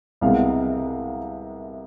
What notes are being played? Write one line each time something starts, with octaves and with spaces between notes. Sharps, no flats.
C2 C3 G#3 B3 F5